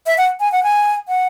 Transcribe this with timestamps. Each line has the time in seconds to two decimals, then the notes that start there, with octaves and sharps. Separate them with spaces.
0.06 E5
0.18 F#5
0.40 G#5
0.52 F#5
0.63 G#5
1.08 F#5